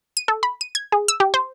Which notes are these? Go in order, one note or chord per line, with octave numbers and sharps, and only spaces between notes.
D#7
A4
B5
D#7
G#6
G#4
E6
G4
C5